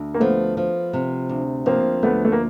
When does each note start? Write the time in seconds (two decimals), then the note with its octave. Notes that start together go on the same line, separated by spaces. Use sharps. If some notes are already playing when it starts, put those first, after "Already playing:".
Already playing: D2
0.14 A#3
0.20 F3 A3 B3
0.57 F3
0.93 C3
1.29 D2
1.66 F3 A#3 C4
2.03 D2 A3 B3
2.25 A3
2.32 A#3